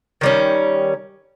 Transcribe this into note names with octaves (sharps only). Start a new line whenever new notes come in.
D#3 G3 C#4